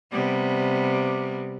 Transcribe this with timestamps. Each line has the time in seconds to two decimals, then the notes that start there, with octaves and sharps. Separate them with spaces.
0.12 C3 G3 B3